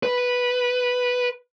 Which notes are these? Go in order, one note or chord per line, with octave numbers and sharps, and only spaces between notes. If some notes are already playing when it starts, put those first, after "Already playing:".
B4